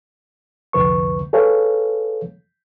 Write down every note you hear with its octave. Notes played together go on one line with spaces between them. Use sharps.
C2 F2 D3 B4 C#6
G#4 A4 B4 C#5 F5